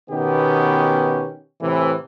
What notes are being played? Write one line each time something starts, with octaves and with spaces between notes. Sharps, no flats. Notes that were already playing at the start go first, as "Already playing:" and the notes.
B2 D#3 B3 C#4 G4
A2 C3 E3